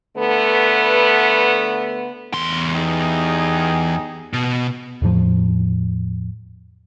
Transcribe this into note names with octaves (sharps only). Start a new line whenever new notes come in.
D3 A3 B3 B4
E2 C6
D#4 G4 G#4
B2
E2 A2 F3